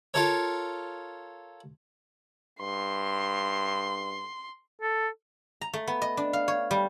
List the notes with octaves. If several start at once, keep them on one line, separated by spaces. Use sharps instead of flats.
F4 A4 A#4 C#5
G2 C6
A4
A#5
A3
B3
D#5
D4
F5
C#5
G3